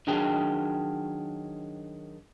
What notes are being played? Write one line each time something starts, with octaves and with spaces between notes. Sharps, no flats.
D#3 F#3 D4 G#4 G5